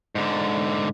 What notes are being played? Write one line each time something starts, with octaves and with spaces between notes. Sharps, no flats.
G#2 D3